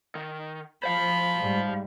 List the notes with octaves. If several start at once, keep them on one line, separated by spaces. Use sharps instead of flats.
D#3
F3 C5 F5 B5
G#2 G3